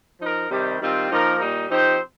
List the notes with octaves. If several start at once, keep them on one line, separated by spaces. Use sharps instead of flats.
F3 D#4 A#4
C3 D#3 G3
D#3 G3 C4 F4
F3 A#3 D#4 A#4
A#2 G3 D#4
F3 C4 D#4 G4 C5